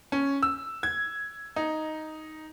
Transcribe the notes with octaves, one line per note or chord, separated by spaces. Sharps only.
C#4
E6
G#6
D#4